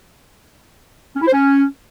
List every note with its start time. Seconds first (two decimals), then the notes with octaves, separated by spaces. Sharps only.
1.16 C#4
1.21 E4
1.27 C5
1.33 C#4